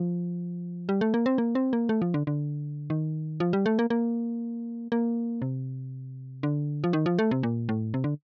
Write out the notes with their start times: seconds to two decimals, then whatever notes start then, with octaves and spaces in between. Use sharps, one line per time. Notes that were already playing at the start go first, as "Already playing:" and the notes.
Already playing: F3
0.89 G3
1.01 A3
1.14 A#3
1.26 C4
1.38 A#3
1.55 C4
1.73 A#3
1.89 A3
2.02 F3
2.14 D3
2.27 D3
2.90 D#3
3.40 F3
3.53 G3
3.66 A3
3.79 A#3
3.90 A#3
4.92 A#3
5.42 C3
6.43 D3
6.84 F3
6.93 D#3
7.06 F3
7.19 A3
7.31 C3
7.43 A#2
7.69 A2
7.94 C3
8.04 D3